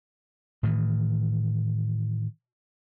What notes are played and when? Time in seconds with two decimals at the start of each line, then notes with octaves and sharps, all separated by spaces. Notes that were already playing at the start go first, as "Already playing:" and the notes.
0.63 A2 D#3 E3